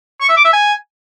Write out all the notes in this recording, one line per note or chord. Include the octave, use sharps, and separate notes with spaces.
C#6
E5
D6
E5
G#5